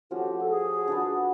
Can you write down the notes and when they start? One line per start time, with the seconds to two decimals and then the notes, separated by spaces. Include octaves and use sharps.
0.11 F3 A3 C#4 F#4 G4
0.41 A4
0.50 G#4
0.88 D4 F#4 B4